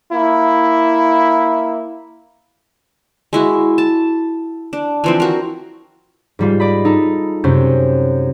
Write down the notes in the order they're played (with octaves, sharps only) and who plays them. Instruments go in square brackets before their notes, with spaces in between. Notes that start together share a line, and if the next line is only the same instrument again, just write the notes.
[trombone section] A#3 E4
[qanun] G#3 E4 F#4
A5
D4
E3 F3 C4
F#4 A#4
[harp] G#2 G3 F4
D5 D#5 B5
D#4 A4
F#2 C3 C#4 C#6 G6